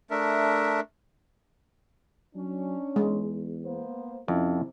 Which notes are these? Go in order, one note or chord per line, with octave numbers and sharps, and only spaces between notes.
A3 D4 A#4 E5
F#3 C#4 D4
E2 G#3
A#3 B3 C5
F2 C3 C#4 E4